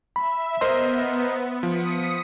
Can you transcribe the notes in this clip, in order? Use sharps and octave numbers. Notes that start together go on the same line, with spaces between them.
E5 B5
B3 A#4 C5 D#5 C6
F3 D#6 B6 C#7